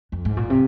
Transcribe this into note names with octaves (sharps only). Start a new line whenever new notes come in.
F2
G#2
A#2
C3